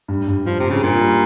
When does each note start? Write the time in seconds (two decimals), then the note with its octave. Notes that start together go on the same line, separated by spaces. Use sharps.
0.08 G2
0.27 G2
0.46 G2 F3
0.60 G2 C3
0.70 C#3
0.83 G2 A#2
1.01 G3